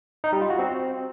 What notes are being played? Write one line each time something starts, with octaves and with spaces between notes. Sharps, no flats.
D#4
G3
F4
F#4
C4